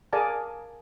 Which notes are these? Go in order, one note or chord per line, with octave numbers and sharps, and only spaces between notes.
G#4 A#4 D5 F5 G#5 A5